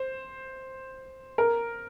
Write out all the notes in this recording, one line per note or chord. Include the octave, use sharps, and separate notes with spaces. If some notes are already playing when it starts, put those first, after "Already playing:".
Already playing: C5
A#4